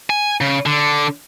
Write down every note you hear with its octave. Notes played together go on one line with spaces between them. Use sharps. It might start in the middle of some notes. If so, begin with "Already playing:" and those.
G#5
C#3
D3